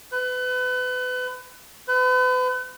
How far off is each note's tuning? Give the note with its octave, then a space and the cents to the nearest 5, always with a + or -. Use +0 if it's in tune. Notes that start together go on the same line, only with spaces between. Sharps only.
B4 +30
B4 +40